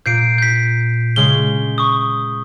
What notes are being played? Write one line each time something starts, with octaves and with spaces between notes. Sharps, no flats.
A#2 G6 C7 D7
G6 B6
C#3 G#3 G7
C#6 D#6